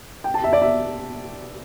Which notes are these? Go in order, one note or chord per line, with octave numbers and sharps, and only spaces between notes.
G5
A5
E5
D5
E5